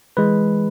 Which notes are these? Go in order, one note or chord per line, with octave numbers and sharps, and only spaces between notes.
E3 G#3 B4